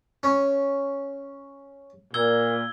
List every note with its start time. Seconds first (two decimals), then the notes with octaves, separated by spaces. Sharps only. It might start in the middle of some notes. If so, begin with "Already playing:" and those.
0.23 C#4
2.14 A#2 E6 G#6 G7